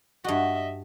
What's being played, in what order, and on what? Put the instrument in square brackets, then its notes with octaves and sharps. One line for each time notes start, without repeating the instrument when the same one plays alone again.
[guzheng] G2 F#4 [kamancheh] D#5 E5